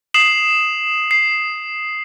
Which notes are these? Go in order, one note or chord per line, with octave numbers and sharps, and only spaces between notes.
D#6 C7 E7 F#7
C7